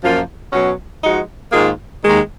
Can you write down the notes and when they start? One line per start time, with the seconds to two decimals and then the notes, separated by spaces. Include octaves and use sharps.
0.03 F#2 F3 A#3 F4
0.53 B2 F#3 C#4 F#4
1.03 F3 G#3 D#4 F#4
1.52 G#2 D#3 A#3 F4 G#4
2.03 D#2 D#3 G#3